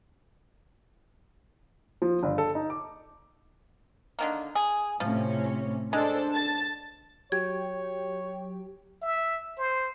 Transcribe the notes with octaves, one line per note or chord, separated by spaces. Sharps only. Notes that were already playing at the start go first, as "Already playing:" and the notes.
F3
G1
A4
D#4
D6
D3 D#3 A#3
G#4
A2 C3 F3 C#4
G#3 D4 A4 C5
A5 A6
F#3 G4 C#5 G5 G#6
E5
C5